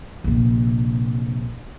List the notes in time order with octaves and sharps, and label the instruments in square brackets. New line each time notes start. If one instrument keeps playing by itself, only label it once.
[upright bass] A#1 C3